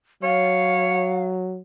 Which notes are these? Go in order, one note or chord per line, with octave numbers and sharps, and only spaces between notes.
F#3 C#5 F5